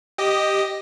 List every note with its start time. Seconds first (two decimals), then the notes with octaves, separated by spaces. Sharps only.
0.18 G4 D#5